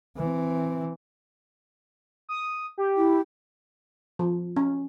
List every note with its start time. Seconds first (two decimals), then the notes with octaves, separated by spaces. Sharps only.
0.17 E3 C4
2.29 D#6
2.78 G4
2.97 E4
4.19 F3
4.57 C#4